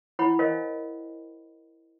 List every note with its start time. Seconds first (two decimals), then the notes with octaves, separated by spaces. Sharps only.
0.19 E4 C#5 F#5 B5
0.39 A#4 C5 C#5 D#5 F5 G#5